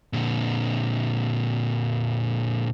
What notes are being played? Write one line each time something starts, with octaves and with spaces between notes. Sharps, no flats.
A#2 D3